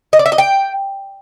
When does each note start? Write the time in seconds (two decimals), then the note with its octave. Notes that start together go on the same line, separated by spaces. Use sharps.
0.13 D#5
0.19 D5
0.26 E5
0.32 D#5
0.38 G5